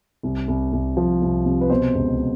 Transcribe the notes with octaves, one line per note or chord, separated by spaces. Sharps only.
C2
C2
C2
F3
C2
C3
B4
B2 C5
C#2